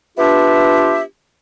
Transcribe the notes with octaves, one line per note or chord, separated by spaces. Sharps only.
B3 D4 F4 G4 E5